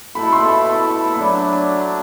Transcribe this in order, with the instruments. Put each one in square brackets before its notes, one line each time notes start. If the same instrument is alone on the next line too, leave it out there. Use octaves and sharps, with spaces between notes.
[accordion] B2 A3 E4 A4 [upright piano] B5
[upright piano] C6
[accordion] F#3 A3 D4 [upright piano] B5